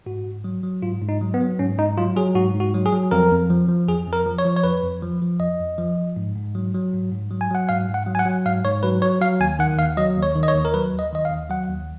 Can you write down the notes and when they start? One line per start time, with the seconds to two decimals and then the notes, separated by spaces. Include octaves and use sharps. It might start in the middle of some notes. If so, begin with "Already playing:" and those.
0.06 G#2 F#4
0.26 G#2
0.44 F#3
0.63 F#3
0.83 G#2 F4
1.02 G#2
1.09 D#4
1.21 F#3
1.34 B3
1.40 F#3
1.59 G#2 C#4
1.78 G#2 D#4
1.97 F#3 F4
2.17 F#3 G#4
2.35 G#2 F#4
2.54 G#2
2.60 F#4
2.74 F#3
2.86 G#4
2.92 F#3
3.11 F2 A#4
3.31 F2
3.50 F3
3.69 F3
3.88 F2 G#4
4.07 F2
4.13 A#4
4.26 F3
4.39 C#5
4.45 F3
4.57 C#5
4.63 F2 B4
4.83 F2
5.03 F3
5.22 F3
5.40 F2 D#5
5.60 F2
5.78 F3
5.98 F3
6.16 G#2
6.36 G#2
6.55 F#3
6.74 F#3
6.93 G#2
7.12 G#2
7.31 F#3
7.41 G#5
7.51 F#3 F#5
7.69 G#2 F5
7.89 G#2
7.94 F#5
8.07 F#3
8.15 G#5
8.19 F#5
8.26 F#3
8.46 G#2 F5
8.64 G#2 C#5
8.83 F#3 B4
9.02 F#3 C#5
9.21 F#3 F5
9.40 D#2 G#5
9.59 D#3 F#5
9.78 D#2 F5
9.97 F#3 D#5
10.17 D#2
10.22 C#5
10.35 D#3
10.43 D#5
10.48 C#5
10.54 D#2
10.65 A#4
10.74 F#3 B4
10.93 D#2
10.99 D#5
11.13 D#3 D#5
11.25 F5
11.31 D#2
11.50 F#3 F#5
11.69 D#2